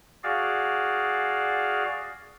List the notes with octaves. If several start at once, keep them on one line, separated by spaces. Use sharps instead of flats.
F#4 G#4 D5 F5